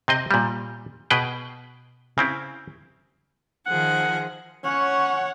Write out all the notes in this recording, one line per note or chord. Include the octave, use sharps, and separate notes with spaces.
C3 C4 D#5
A#2 G3
B2 G#4 B4 G5
C#3 C4 E4
D#3 F3 G#4 F#5
C#4 C#5 F#5